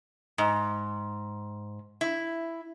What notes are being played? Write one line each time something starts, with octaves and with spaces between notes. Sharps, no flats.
G#2
E4